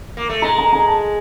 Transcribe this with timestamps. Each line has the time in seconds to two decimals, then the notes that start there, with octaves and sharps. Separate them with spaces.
0.17 A#3
0.30 A3
0.42 G#3 A#5
0.58 A#5
0.73 A#5
0.88 A5